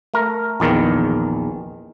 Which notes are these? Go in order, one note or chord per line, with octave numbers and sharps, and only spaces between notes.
A3 A#4
A#1 E2 D#3 A#4